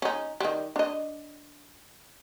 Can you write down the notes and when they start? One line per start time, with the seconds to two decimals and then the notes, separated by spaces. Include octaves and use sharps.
0.02 C#4 D#4
0.40 D#3 G3
0.76 D4 D#5